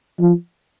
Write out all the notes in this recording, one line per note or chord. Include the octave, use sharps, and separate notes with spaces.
F3